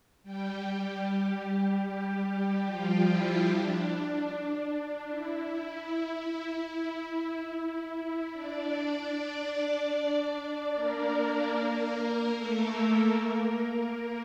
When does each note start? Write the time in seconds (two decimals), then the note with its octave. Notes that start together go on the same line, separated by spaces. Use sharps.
0.23 G3 G4
1.85 G3 G4
2.66 F3 F4
3.07 E4
3.46 D4
5.08 E4
8.33 D4 D5
9.13 D4 D5
10.74 A#3 A#4
12.36 A3 A4
13.17 A#3 A#4